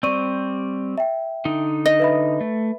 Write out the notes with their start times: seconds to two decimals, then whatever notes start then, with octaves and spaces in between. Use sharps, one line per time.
0.03 G3 C4 D5 C#6 D#7
0.98 E5 G5
1.45 D3 D#4
1.86 D#5
2.00 B4 E5 B5
2.41 A3